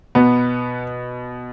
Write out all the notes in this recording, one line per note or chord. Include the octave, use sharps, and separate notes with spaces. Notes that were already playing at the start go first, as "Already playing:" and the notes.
B2 B3